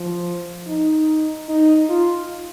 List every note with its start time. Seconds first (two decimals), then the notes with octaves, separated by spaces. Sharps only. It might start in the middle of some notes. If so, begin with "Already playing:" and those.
Already playing: F3
0.68 D#4
1.49 D#4
1.90 F4